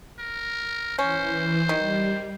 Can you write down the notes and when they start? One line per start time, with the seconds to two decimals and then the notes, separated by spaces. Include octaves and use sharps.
0.19 A#4
0.99 E3 C#4 C5
1.69 D#3 G3